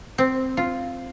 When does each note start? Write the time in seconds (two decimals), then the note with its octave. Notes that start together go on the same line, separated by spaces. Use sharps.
0.18 C4
0.57 F4